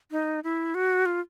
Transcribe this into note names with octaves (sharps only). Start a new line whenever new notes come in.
D#4
E4
F#4
F4